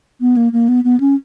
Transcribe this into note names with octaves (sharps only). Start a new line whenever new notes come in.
B3
A#3
A#3
B3
B3
C#4